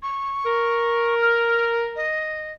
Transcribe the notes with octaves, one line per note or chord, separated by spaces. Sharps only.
C#6
A#4
F6
D#5